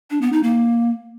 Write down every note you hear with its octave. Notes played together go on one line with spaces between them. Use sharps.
D4
B3
D#4
A#3